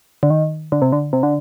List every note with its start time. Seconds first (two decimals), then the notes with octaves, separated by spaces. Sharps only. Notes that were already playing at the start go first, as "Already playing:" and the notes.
0.23 D3
0.30 D#3
0.72 D3
0.82 C3
0.92 D3
1.13 C3
1.23 D3